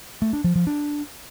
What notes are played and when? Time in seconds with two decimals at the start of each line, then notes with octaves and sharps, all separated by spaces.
0.22 A3
0.33 D4
0.44 F3
0.56 F3
0.67 D4